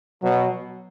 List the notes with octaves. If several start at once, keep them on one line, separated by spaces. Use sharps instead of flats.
B2 F#3